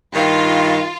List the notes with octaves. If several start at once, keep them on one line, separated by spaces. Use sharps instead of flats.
G2 D#3 F4